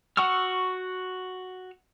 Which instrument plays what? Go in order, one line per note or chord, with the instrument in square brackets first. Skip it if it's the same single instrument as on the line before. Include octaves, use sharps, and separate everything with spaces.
[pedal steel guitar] F#4 F#5 C#6 E6 F6